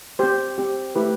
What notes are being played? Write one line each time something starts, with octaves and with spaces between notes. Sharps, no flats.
C4 G4 C5
C4 G4
A3 E4 G4 B4